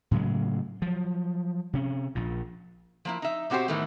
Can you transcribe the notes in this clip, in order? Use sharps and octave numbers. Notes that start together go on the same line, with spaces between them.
A2 C#3 F#3 G#3
F3 F#3
C3 C#4
A#1 A#2
F3 A#3 E4
D#4 E5
B2 C4 F#4 G4 C5
A2 D#3 E3 A3 B3